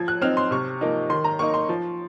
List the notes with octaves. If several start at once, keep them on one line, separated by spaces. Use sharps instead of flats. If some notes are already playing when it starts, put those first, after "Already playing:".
Already playing: F3 G#6
F#6
C4 D#4 F6
C6
C3 C#6
F3 A#3 D#4
D#3 C6
A#5
A#3 D#4 C#6
C6
F3